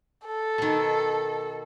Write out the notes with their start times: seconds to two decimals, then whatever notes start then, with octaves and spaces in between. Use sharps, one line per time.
0.25 A4
0.58 B2 D#3